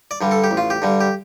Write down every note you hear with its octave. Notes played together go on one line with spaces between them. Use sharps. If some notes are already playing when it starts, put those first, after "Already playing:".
D5
G2 D3 G3
A4
G4
A1
F4
G4
G2 D3 G3
G4